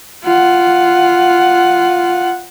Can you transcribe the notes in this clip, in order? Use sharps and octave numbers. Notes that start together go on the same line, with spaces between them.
F4 F#5